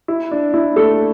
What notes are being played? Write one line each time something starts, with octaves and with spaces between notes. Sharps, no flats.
E4
D4
E4
A3 A4